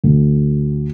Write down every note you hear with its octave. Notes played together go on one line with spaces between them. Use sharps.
D2